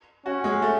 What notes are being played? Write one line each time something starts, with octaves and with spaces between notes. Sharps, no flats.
C#4 F#4
G#3
A3